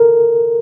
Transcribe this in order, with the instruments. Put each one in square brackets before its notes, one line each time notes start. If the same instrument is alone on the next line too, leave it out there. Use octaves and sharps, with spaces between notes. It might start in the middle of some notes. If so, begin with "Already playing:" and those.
Already playing: [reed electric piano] A4 A#4